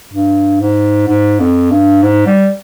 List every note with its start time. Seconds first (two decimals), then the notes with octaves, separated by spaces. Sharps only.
0.14 G2
0.61 G#2
1.08 G#2
1.40 F2
1.71 G2
2.02 G#2
2.27 G3